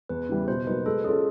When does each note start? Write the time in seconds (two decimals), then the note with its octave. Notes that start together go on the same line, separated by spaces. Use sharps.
0.09 E2 B4
0.29 C#3 E3 G3
0.47 B2 C5
0.66 F#3 A#3 D#4 B4
0.86 G#3 A4
1.04 C#4 F4 G#4 A4